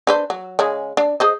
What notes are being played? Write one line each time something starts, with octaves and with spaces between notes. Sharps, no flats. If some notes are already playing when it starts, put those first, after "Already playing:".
D4 B4 C5
F#3
C#3 G#3
D4
G#4 C5 D#5